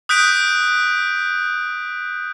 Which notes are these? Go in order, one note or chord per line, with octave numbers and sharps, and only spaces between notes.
D#6 F#6 G6 B6 D7